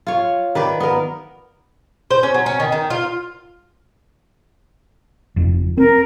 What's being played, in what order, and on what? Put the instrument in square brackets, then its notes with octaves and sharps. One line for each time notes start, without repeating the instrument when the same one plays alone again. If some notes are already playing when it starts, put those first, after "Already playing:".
[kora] F4 C#5
D#3 B4 D5
B3 A#4
[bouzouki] C5
C#4
F#3
C#4
D#3
D#3
F4
[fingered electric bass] F#1 F2
[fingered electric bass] C4 [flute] A#4